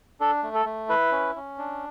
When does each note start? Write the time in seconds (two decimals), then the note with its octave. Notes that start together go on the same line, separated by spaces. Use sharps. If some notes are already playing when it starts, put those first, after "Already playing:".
0.20 D4 A4
0.43 A3
0.55 A4
0.66 A3
0.89 E4 B4
1.12 C#4
1.36 C#4
1.58 D4